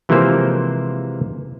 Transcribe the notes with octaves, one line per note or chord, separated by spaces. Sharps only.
C3 E3 F3 G#3 A#3 C5